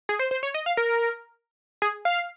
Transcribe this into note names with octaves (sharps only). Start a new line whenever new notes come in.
G#4
C5
C5
C#5
D#5
F5
A#4
G#4
F5